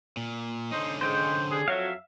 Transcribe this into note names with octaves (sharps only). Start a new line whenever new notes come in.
A#2
D3 C#4 D#4 C5
G#2 C5 G5
G3 G#4
F2 F#3 E5 F5